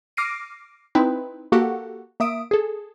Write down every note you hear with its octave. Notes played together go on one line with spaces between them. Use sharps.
D6 F6 A#6 C7 D7 D#7
C4 D#4 E4 B4
A#3 F#4 G4 A4 F#5
A#3 E5 D#6 D7
G#4 A4